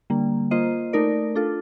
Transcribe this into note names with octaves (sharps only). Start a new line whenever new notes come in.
D3 G3 A#3
A#3 F4 C5 D#5
A3 D#4 A#4 D5
D4 F4 A4